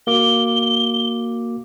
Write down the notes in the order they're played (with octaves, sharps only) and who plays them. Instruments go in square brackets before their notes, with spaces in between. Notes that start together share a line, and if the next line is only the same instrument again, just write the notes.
[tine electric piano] A#3 F#4 D6 [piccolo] G7